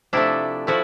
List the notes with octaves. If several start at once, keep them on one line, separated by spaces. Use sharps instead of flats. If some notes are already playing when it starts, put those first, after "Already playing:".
C3 F3 A3 D4 E4
F3 A3 E4 F#4